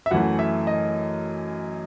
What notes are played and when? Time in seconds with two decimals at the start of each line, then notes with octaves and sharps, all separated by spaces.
0.06 E5
0.11 F#2 E3 A3 F#5
0.39 E5
0.67 D#5